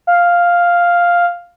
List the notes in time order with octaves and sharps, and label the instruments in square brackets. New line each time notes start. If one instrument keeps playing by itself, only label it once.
[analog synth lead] F5